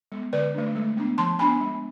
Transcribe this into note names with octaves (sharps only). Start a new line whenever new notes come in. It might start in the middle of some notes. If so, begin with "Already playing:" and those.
G#3 B3
D3 B4 D5
A3 D4
G#3
B3 D4
F3 A5 C6
B3 D4 G#5 B5
G#3